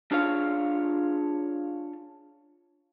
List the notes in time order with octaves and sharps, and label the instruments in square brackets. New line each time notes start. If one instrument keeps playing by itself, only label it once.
[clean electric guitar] D4 F4 G#4 C#5 F5